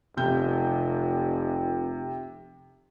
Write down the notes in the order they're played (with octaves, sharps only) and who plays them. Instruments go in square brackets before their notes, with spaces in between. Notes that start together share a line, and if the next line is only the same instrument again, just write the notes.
[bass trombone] F1 [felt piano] C3 G6